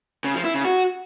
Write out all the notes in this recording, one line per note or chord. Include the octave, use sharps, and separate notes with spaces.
C#3
F3
E4
C#3
F#4